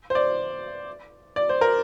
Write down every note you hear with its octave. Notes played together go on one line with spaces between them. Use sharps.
C5
D5
D5
C5
A#4